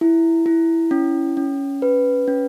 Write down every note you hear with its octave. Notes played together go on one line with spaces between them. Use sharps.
E4
E4
C#4
C#4
B4
C#4